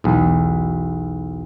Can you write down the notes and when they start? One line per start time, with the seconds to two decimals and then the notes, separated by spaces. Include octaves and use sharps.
0.04 B1 E2